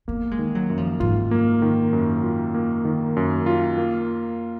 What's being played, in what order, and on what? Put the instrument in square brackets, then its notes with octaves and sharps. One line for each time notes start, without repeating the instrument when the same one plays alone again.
[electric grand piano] A#3 [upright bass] B3
[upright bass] G#3
[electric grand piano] D#3
[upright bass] F#3
[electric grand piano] F#2
[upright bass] F3
[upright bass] G#2 [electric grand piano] F4
[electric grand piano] A#3
D#3
F#2
F4
A#3
D#3
F#2
F4
A#3